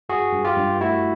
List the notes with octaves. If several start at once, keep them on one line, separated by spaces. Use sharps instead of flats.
G2 F#4 G#4
G2
F4 G4
G2
A3 E4 F#4